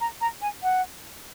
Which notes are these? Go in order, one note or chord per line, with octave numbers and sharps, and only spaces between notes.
A#5
A#5
G#5
F#5